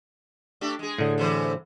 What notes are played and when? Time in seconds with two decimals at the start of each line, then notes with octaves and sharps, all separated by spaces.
0.61 A3 D4 G4
0.79 G#3 G#4
0.99 A2 D3
1.18 C3 E3 C5